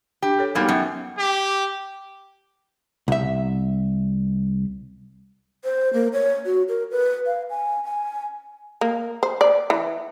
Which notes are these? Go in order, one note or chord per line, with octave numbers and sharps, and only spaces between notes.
D4 G4
A4 C#5
F#3 G3 A#3 B3 D#4 G#5
F#2 G5
G4
C2 E5
C5
A#3
C#5
F#4
A#4
B4
F5
G#5
G#5
A#3
C5
D5
E3